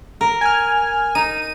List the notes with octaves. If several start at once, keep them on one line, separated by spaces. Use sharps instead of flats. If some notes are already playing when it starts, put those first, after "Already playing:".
A#4
G#5 F6
D#4 D#7